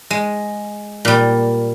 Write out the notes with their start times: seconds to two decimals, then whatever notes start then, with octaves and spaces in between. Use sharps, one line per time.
0.10 G#3
1.05 A#2 G3